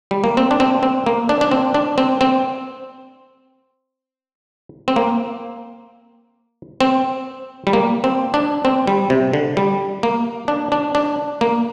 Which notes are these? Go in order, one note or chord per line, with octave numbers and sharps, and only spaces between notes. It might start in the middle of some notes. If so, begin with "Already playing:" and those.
G3
A#3
C4
D4
C4
C4
A#3
D4
D4
C4
D4
C4
C4
C4
A#3
C4
G3
A#3
C4
D4
C4
G3
C3
D3
G3
A#3
D4
D4
D4
A#3